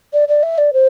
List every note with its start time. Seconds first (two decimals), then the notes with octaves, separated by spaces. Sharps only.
0.13 D5
0.28 D5
0.43 E5
0.58 D5
0.73 C5